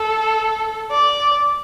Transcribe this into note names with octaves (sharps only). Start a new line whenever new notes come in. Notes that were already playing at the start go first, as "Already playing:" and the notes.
Already playing: A4
D5